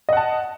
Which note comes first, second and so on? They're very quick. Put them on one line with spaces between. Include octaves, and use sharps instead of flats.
D#5 F#5 A5